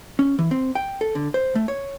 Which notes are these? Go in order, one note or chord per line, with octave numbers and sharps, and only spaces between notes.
C#4
E3
C4
G5
A4
D3
C5
A3
C#5